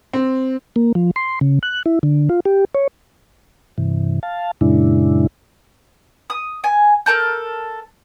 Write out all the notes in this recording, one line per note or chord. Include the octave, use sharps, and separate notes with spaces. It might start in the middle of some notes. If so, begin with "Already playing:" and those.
C4
A#3
F3
C6
C#3
F#6
E4
D3
F4
G4
C#5
G2 C3 E3
F5 A5
F#2 A#2 C#3 G#3 D4 E4
D#6
G#5
A4 A#4 A5 G6